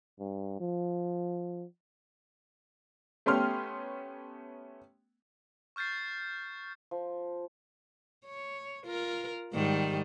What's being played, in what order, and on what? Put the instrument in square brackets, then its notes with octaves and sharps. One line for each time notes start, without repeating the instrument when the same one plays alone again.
[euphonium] G2
F3
[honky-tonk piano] A3 B3 C#4 G4 C6 F6
[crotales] C#6 F6 G6 A6 C7
[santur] F3
[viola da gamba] C#5
F4 A#4
G#2 D#3 G3